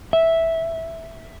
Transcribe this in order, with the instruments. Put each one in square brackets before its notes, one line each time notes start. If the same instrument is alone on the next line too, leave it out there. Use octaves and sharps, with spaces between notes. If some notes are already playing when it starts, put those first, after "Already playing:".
[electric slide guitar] E5